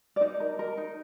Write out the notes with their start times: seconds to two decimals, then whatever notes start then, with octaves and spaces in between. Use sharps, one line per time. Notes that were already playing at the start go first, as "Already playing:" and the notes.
0.16 D5
0.21 D#4 D#5
0.40 A#4
0.59 A#4
0.77 D#4